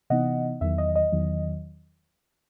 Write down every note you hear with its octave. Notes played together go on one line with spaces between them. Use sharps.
C3 E3 B3 D#4 D#5 F#5
E2 D#3 F#3 E5
D#5
D#5
E2 D#3 F#3